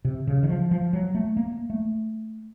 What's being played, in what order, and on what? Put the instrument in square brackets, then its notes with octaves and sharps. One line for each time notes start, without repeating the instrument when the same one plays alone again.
[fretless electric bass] C3
C#3
D#3
F3
F3
F#3
A3
A#3
A3